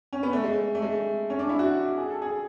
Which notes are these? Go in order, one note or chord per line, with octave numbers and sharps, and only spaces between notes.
C#4
B3
A3
G#3
A3
G#3
C#4
D4
E4
F#4
G#4
A4
G#4